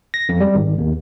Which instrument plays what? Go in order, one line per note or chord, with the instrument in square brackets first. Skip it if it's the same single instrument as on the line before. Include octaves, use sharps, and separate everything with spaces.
[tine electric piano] A#6
F2
G3
G#1
D#2